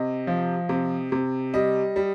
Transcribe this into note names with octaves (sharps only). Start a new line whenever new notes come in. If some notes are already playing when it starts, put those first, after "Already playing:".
Already playing: C3 D#5
F3
C3
C3
G3 D#5
G3